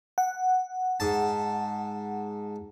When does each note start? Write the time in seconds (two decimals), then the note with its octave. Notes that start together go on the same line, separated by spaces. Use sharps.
0.18 F#5
1.00 G#2 A5